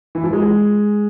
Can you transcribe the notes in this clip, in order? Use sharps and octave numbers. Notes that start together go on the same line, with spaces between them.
E3
F3
G#3